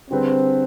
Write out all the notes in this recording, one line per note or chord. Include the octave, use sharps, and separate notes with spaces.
D3 G3 C4 D4 G#4 B4